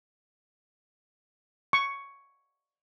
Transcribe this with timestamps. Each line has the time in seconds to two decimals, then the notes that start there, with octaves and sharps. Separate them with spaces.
1.73 C#6